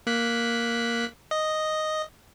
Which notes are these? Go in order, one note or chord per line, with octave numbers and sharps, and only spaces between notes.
A#3 F#6 B6
D#5